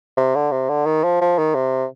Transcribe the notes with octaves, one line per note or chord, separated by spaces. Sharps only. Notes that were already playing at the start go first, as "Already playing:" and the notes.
C3
D3
C3
D3
D#3
F3
F3
D#3
C3